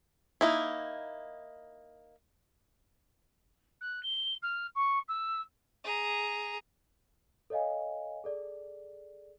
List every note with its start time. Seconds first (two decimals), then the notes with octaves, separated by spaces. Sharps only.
0.41 A#3 D#4 E4
3.81 F#6
4.03 G7
4.42 F6
4.75 C#6
5.08 E6
5.84 G#4 A#5
7.50 A4 C#5 D#5 F5 G#5
8.24 G#4 A4 D5